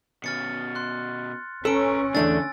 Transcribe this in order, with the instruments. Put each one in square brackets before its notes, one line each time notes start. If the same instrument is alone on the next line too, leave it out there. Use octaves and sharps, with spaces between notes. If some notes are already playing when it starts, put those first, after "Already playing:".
[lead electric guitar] B2 C#4 [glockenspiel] F6 A6 C#7
[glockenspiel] C6 F#6
[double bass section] C#4 [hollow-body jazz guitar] A4 [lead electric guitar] B4 A#5 [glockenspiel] E6 D7
[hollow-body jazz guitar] E2 A3 D4 [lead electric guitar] D3 [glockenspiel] G#5 E6 A6